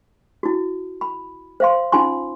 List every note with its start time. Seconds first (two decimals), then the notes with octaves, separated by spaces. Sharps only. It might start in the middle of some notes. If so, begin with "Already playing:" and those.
0.43 E4 F#4
1.01 B5
1.60 C5 F5 C6
1.92 C#4 D#4 F4 G#5 C6